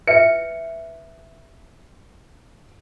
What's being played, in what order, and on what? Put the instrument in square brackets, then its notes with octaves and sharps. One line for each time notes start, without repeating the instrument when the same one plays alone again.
[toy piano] B4 E5 [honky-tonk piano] C#7